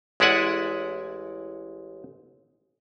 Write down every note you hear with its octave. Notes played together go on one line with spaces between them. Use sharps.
A1 G#3 E4 D5 F#5 G#5